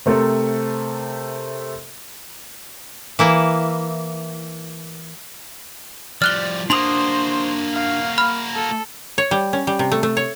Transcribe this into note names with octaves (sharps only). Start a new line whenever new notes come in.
C3 A3 C4 A4 A#4
E3 A#3 E4
F3 G3 D5 F6 F#6 G7
A#3 D4 F#4 C5 C6 D#6 F7 F#7
F5
B5 F6
A4
C#5
G3
C#4
G3
C3
A3
A3
C#5